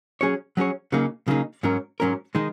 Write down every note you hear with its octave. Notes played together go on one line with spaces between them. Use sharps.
F#3 C#4 G#4 C#5
F#3 C#4 G#4 C#5
C#3 F#3 A#3 D#4 G#4
C#3 F#3 A#3 D#4 G#4
G#2 F#3 C#4 A#4
G#2 F#3 C#4 A#4
D#3 G#3 D#4